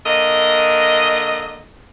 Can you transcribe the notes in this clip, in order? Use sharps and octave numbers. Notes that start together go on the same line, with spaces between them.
D3 A#3 D#5